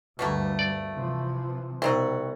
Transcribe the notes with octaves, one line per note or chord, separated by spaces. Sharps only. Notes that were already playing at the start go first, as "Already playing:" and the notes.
D2 G2 B2 G3 A3 A#3
D5
C3 E3 F3
C2 B2 C4 D#4 F#4